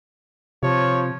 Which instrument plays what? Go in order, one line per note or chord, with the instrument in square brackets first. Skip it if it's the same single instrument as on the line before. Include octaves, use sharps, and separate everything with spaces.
[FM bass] C3 [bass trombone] F3 [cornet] C#5